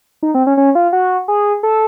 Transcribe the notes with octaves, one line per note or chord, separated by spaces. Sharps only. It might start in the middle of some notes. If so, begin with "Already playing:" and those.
D#4
C4
C#4
C#4
F4
F#4
G#4
A4